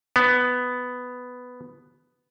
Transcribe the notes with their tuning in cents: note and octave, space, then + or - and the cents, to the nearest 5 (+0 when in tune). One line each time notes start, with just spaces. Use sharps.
B3 +10